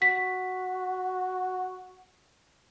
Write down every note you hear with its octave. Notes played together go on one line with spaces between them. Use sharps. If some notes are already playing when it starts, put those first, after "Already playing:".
F#4 B6